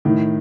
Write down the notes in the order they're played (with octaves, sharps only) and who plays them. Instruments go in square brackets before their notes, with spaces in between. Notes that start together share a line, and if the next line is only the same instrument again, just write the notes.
[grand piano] A2 [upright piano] D#3